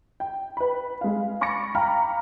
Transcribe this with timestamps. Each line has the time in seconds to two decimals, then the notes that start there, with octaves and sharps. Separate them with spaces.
0.20 G5
0.57 B4 B5
1.01 G#3 F5
1.41 B5 C#6 D6 A6 A#6 C#7
1.75 F5 G5 A#5 B5 F6